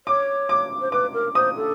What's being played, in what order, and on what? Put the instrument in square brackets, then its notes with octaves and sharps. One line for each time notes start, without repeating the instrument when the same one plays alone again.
[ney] C#5 [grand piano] D6
[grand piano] D6
[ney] C5
[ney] B4 [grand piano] D6
[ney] A#4
[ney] C5 [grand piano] D#6
[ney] A4